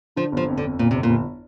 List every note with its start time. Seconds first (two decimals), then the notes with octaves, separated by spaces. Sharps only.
0.16 D3 F3
0.32 G1 F3
0.48 F2
0.58 D3
0.63 F2
0.79 G1 A#2
0.91 G1 C3
1.03 A#2
1.10 G1